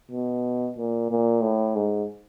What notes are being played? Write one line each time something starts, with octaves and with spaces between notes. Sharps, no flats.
B2
A#2
A#2
A2
G#2